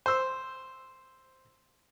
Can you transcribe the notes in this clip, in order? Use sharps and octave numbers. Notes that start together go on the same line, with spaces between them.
C5 E6